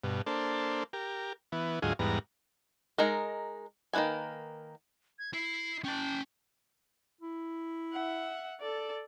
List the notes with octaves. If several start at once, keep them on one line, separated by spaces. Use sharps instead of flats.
G2 B2
A#3 D4 A4 C5
G4 A#4
E3 B3
D2 G#2 F#3 F4 G#4 D#5
E2 G#2 G3 B3 A#5
G#3 D#4 A#4
D#3 A#3 E4 B4 G#5
G#6
E4 C7
C#4 G5 A5
E4
E5 F#5
A4 D5